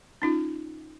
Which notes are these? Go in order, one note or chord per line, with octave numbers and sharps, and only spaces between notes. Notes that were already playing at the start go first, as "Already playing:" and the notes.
C#4 D#4 F4